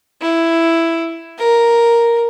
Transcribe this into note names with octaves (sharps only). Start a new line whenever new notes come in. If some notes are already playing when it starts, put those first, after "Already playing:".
E4
A#4